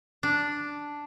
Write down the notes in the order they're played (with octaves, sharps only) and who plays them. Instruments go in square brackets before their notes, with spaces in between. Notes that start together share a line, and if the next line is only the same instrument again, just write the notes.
[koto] D4